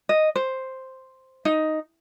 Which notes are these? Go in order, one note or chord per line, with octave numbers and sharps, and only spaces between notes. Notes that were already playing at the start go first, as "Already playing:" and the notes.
D#5
C5
D#4